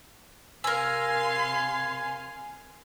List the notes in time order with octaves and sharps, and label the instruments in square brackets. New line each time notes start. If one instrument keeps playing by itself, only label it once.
[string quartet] C3 F5 C6 [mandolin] A#4 E6 [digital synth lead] G#5